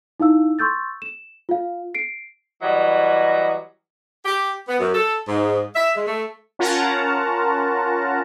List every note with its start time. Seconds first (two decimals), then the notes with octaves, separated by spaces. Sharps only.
0.20 D#4 E4 F5 E6
0.59 C6 C#6 E6 G6 A6
1.02 E7
1.49 F4 F5
1.95 C7 D7
2.63 E3 F#3 G3 D#5
4.25 G4
4.68 B3
4.80 F#2
4.94 A4
5.28 G#2
5.75 E5
5.95 G#3
6.07 A3
6.59 C#4 F4 A#4 F#5 A5 A#5